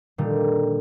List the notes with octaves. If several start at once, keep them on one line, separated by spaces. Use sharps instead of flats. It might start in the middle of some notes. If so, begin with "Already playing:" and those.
A#2 D3 D#3 G3